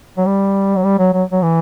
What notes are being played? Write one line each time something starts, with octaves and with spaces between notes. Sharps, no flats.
F#3
G3
F#3
G3
F#3
F#3
F#3
E3